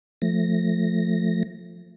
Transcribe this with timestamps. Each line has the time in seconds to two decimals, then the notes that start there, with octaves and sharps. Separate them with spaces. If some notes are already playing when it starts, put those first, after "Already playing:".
0.22 F3 A3 A#6